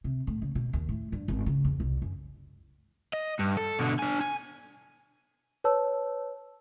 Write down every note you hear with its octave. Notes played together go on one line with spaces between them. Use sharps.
C3
A2
C#3
B2
D#2
A2
G2
G#1
C#3
E2
C2
F#2
D#5
G2
A4
B2 D3
D4 G#5
G#5
B4 C#5 A5 E6